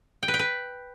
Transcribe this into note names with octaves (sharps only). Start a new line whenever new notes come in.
G5
B4
G5
B4